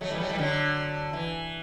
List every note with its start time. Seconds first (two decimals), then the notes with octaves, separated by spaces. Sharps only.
0.01 F#3 A3
0.10 E3 G3
0.20 F#3 A3
0.29 E3 G3
0.38 D3 F#3
1.13 E3